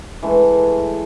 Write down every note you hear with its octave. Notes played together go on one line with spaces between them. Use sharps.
E3 G#3 A3 D4